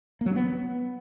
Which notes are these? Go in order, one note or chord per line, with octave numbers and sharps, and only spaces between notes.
A#3
F#3
C#4
B3